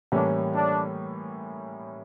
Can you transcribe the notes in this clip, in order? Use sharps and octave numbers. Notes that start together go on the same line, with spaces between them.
A2 E3 G3 A#3 C#4 D4
D4